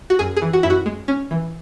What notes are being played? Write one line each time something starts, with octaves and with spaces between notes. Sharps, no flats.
F#4
F#2 G#4
G#4
E3
F#4
F#2 E4
F#4
G#3
C#4
E3